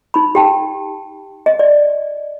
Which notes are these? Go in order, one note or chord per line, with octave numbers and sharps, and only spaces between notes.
D#4 B5
G4 G5 A5
D#5
D5